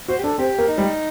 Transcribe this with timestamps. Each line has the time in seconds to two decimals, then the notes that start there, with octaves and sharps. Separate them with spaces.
0.08 F#4 C5
0.18 G4
0.23 D4 A4
0.38 C4 G4
0.58 A#3
0.68 D#4
0.78 G3